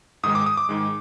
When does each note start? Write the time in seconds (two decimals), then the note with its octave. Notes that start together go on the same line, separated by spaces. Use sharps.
0.23 G#2 D#3 G#3 D#6
0.35 D6
0.46 D#6
0.57 D6
0.69 G#2 D#3 G#3